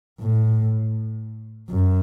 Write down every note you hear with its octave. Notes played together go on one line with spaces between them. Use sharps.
A2
F#2